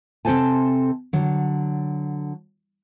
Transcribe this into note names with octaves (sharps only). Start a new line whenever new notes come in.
C3 C4 A4 C5 G#5 A5
D3 F#3